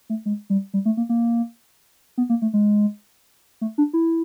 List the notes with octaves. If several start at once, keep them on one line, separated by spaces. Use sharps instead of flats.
A3
G#3
G3
G3
A3
A#3
A#3
B3
A#3
A3
G#3
A3
D4
E4